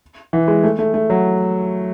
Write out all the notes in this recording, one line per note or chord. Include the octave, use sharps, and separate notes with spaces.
E3
G#3
A3
A3
A3
F#3